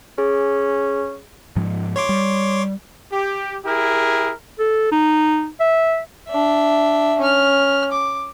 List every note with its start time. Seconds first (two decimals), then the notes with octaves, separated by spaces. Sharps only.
0.18 C#4 G#4
1.56 G#2 F3 G#3
1.96 C#5 C6 D6
2.09 G3
3.13 G4
3.65 E4 G4 G#4 A#4
4.59 A4
4.91 D#4
5.60 E5
6.29 D4 E5
7.19 C#4 F6
7.92 D6